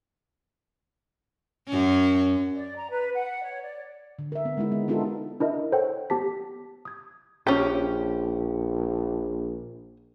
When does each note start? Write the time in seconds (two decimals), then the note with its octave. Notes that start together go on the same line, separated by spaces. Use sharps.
1.67 F#2 C#4
2.54 D5
2.76 A#5
2.90 B4
3.15 F#5
3.43 C#5
3.62 D5
4.19 D3
4.32 A#4 E5
4.45 B3
4.57 G#3 D#4 E4
4.72 B3
4.88 B3 D4 D#4 F4 G4 A4
5.40 D4 E4 A#4 D#5 E5
5.72 A4 C5 C#5 F#5 G5
6.10 B3 G4 A5 B6
6.85 D#6 G#6
7.47 A#1 C#4 G4